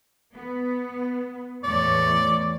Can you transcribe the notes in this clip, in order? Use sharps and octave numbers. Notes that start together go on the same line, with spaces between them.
B3
E2 A2 C#5 D5